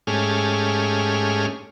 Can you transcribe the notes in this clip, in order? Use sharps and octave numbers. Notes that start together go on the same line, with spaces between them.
G#2 A3 C#4 G4 G#4 F6